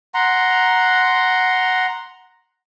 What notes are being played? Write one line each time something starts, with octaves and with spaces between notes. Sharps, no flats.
F#5 A#5 C6